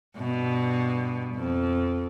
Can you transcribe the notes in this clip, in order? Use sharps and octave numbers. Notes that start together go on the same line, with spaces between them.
G2 B2
F2